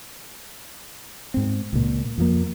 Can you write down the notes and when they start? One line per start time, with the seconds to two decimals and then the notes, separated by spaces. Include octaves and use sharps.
1.34 G#2 C4
1.73 C#2 A#2
2.18 F2 F3 A#3